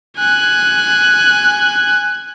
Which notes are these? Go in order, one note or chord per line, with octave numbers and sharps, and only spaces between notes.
G#5 F#6